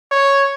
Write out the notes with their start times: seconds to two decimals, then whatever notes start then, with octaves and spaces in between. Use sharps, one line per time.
0.12 C#5